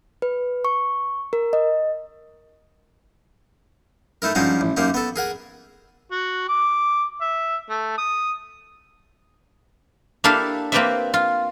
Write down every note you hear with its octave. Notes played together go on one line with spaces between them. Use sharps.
B4
C#6
A#4
D#5
A3 D#4 E4 A#4
G2 F3 G#3 C#4 D#4 F#4
A1
F#2 A#3 D#4 G4
B3 A4
G#4 A#4 F#5 G#5
F#4
D6
E5
A3
D#6
A#3 D4 E4 G4 A4 F5
A#3 C4 G4 B4 D5 E5
F4